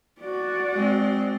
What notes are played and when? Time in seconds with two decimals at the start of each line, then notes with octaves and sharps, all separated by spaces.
0.21 F#4 D5
0.73 G#3 C4